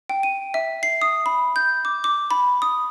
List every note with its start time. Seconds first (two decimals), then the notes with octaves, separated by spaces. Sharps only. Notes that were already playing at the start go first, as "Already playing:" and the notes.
0.10 G5
0.23 D#7
0.54 E5
0.83 C7
1.02 D#6
1.26 B5
1.56 G6
1.85 D6
2.04 D6
2.31 B5
2.62 D#6